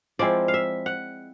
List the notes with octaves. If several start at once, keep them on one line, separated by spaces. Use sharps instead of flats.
F3 G#3 C4 E4 D5
F5
E5
F#5